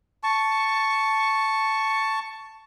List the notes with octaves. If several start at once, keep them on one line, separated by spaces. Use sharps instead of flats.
A5 C#6